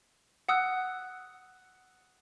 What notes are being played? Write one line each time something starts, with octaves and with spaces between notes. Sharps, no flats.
F#5 D#6 E6 F#6